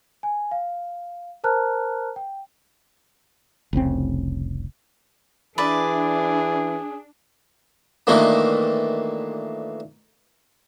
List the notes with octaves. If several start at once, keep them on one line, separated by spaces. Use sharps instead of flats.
G#5
F5
A#4 C5 A5 A#5 F6 F#6
G5
F1 C2 C#3 C4
E3 D4 G#4 B4 D5 E5
A#2 D#3 E3 A3 A#3 D4